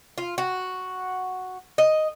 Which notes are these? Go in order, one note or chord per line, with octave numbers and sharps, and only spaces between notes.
F4
F#4
D#5